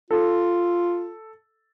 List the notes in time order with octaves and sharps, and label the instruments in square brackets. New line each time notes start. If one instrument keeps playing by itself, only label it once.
[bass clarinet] F4 [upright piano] A4